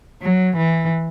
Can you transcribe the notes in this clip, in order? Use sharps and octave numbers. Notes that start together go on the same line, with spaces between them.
F#3
E3